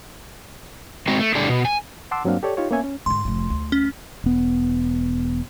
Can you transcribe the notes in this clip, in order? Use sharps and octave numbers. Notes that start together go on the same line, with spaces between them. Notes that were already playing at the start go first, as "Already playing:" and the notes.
G#3 C4 F#4 D#5
A3
A2 D3 G3 D4 G4 G#4
B2
G#5
F#5 A5 C6 D6 E6
G2 F#3 A#3 C4 D4 F5
G4 A4 C#5 D5
D#4 F4 G4 C#5
A#3 B3 C#4 C#5 E5 G#5
C#4
G#2 D3 C6
F1 F3
D2
C#4
E1 B3